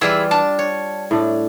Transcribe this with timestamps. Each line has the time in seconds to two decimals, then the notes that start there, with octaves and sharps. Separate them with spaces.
0.01 E3 G3 E4 F4 G#4 E6
0.31 D4 A5
0.59 C#5
1.11 A2 D4